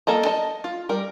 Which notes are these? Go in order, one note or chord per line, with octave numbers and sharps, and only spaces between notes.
A#3 A4 D#5 A#5
A4 D#5
F4
G3 A#4